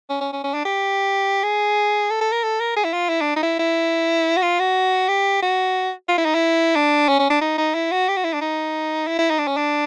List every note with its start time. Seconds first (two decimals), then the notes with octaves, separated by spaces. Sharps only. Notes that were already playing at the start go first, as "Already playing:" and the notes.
0.10 C#4
0.21 C#4
0.33 C#4
0.44 C#4
0.54 D4
0.65 G4
1.43 G#4
2.10 A4
2.21 A4
2.32 A#4
2.43 A4
2.60 A#4
2.76 G#4
2.84 E4
2.93 F4
3.09 E4
3.21 D4
3.36 D#4
3.43 E4
3.59 E4
4.37 F#4
4.42 F4
4.59 F#4
5.08 G4
5.42 F#4
6.08 F4
6.18 E4
6.25 D#4
6.35 E4
6.75 D4
7.08 C#4
7.20 C#4
7.30 D4
7.41 D#4
7.58 D#4
7.75 E4
7.92 F#4
8.08 G4
8.16 F#4
8.24 E4
8.33 D4
8.41 D#4
9.07 E4
9.19 E4
9.30 D#4
9.39 D4
9.47 C#4
9.57 D4